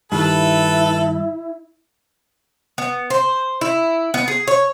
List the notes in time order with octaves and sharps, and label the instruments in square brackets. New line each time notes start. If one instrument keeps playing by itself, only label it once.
[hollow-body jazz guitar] G2 D#3 [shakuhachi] E4 [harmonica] A4 B4
[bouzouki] B3
C5
E4
B3
G#4
C#5